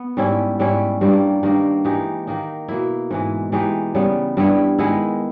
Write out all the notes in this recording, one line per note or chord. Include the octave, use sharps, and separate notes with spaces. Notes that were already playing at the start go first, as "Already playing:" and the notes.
Already playing: B3
G#2 G3 C#4 E4
G#2 G3 C#4 E4
G2 G3 A#3
G2 D#3 A#3 D#4
E3 G#3 D#4 G4
D#3 A#3 D#4
B2 A#3 E4
G#2 E3 G#3
E3 G#3 D#4 G4
C#3 G3 B3
G2 G3 B3 E4
D#3 G#3 B3 E4